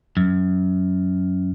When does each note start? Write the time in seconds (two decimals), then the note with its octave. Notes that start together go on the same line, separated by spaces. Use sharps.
0.17 F#2